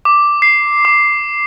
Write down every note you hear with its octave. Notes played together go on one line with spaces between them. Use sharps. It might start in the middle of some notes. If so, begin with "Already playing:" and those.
D6
C7
D6